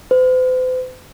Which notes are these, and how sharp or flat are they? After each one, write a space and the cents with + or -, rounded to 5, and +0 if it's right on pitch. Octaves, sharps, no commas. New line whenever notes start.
C5 -45